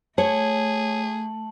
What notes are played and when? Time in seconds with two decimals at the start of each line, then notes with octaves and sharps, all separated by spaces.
0.18 A3 G#4 C#5 A5 F#7